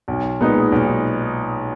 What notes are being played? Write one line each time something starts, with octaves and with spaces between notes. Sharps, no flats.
B1
A#2 G#3 B3 D#4
B1